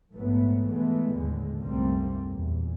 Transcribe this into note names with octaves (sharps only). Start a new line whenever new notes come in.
A#1 G#2 F#3 A3 B3
E3 G#3 A3 B3
D#2 A2 D3 G#3
C2 F#2 G3 A3 A#3 C4
E2 A#2